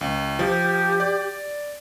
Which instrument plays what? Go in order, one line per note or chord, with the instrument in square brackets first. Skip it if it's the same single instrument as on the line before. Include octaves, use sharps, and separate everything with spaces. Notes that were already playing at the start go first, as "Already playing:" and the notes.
[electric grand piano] C#2
[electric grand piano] F3 [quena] G4
[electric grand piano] D5